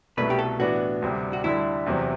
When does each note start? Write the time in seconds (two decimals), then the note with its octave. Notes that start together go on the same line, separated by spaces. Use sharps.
0.17 C2 B2 A3 E4 B4
0.30 G4
0.39 A4
0.59 A2 E3 B3 D4 F#4
1.02 D2 C3 G3
1.33 F#4
1.44 D2 D3 G3 E4
1.86 E2 C3 F#3 C4